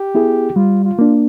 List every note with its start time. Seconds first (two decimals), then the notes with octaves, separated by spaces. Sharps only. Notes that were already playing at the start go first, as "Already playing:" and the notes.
Already playing: G4
0.15 B3 E4 G#4
0.56 G3 F4
0.84 F4
0.99 A#3 D4